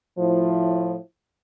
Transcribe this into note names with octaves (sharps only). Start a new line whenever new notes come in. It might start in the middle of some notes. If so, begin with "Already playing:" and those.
A2 F3 E4